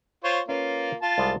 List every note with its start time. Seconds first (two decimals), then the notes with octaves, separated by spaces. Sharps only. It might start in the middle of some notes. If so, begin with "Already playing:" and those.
0.24 F4 C5 C#5
0.48 A#3 C#4 F4 B4 C#5
1.02 F4 A5
1.18 C2 G3 G#3